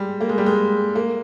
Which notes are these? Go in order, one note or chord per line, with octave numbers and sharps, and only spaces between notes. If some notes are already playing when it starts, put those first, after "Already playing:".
Already playing: G3 G#3
A#3
G#3
G3
G#3
A#3